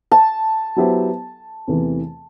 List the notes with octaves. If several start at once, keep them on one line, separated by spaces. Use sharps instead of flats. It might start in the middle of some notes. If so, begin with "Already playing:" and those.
A5
F#3 B3 E4 G4 C5
E2 C3 E3 A3